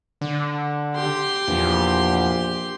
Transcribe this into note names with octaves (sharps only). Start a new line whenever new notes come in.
D3
G4 C6
A#1 E2